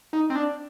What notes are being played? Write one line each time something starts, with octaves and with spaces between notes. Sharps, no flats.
D#4
C4
D4